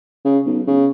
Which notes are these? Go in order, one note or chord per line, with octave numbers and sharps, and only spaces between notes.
C#3
B1
C#3